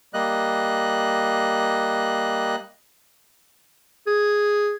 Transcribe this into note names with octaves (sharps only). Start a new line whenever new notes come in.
G3 A#3 D#5 F#6
G#4